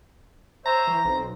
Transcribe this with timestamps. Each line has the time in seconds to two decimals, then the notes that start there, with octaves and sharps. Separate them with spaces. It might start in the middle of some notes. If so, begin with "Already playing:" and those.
0.66 C5 C#5 E5 A#5
0.87 E3
1.05 B1 C4